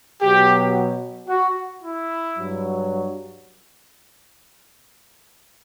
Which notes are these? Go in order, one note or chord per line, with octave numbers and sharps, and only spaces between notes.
B2 F#3 G4
F#4
E4
G2 F#3